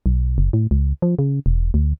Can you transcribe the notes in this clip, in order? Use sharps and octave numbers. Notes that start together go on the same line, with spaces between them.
B1
F#1
A2
C#2
F3
C#3
E1
D2